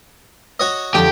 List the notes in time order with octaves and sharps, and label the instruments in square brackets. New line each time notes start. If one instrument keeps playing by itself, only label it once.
[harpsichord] F#4 C#5 D#5
[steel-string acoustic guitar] F2 D3 F3 [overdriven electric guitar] G4